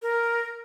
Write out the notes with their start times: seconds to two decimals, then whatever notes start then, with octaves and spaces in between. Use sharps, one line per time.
0.02 A#4